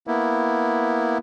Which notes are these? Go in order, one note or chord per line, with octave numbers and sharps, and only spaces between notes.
A#3 B3 E4